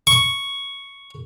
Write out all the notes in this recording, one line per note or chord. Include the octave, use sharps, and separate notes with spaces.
C#6